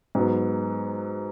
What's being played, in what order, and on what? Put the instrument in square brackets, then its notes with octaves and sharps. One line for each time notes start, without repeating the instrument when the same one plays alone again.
[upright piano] G#2 F#3 B3